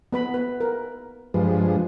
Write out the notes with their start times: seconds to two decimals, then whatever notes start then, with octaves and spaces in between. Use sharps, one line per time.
0.13 B3 B4 B5
0.34 B4 B5
0.60 A#4
1.34 G2 F3 G#3 B4